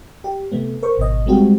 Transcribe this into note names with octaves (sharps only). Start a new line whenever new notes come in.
G4
C3 A3 B3
A#4 C5 C#6
G#1 B2 D#5
G3 G#3 C4 F#4 G4